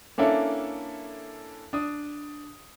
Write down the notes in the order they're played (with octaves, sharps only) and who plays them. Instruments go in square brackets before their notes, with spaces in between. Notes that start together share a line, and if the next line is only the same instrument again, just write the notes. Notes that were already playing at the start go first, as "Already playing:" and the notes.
[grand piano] A#3 C#4 D4 E4 A4
D4 D#6